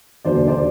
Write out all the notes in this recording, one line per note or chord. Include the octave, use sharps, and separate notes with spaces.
E1 D#2 D3 F#3 B3 C5 D5
C5 D5